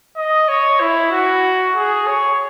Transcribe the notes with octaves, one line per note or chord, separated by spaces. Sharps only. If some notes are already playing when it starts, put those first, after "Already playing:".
D#5
C#5
E4
F#4
G#4
C#5